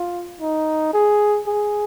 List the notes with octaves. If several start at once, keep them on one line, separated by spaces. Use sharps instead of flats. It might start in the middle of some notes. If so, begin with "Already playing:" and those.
Already playing: F4
D#4
G#4
G#4